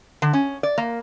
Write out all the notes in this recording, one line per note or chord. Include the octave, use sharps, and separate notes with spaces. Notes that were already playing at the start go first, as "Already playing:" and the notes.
D3
C#4
D5
A#3